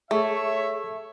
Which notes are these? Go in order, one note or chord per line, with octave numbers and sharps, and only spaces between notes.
A3 G#4 A4 C#5 E5 C#6